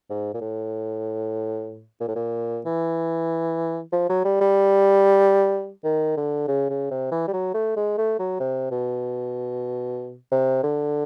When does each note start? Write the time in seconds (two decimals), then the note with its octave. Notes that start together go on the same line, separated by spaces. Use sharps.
0.10 G#2
0.34 A#2
0.41 A2
2.00 A#2
2.08 A2
2.15 A#2
2.65 E3
3.92 F3
4.09 F#3
4.25 G3
4.41 G3
5.84 D#3
6.17 D3
6.48 C#3
6.70 C#3
6.91 C3
7.12 E3
7.27 G3
7.33 F#3
7.54 A3
7.76 G#3
7.98 A3
8.19 F#3
8.40 C3
8.71 B2
10.31 C3
10.63 D3